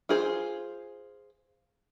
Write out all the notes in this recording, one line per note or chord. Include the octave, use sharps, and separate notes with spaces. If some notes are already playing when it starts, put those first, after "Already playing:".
F4 G#4 C5